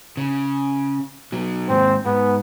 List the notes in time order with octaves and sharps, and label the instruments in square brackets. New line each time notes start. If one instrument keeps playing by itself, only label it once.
[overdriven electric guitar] C#3
B2 F#3
[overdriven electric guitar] D#2 G#2 [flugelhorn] C4
[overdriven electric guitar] G#2 [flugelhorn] B3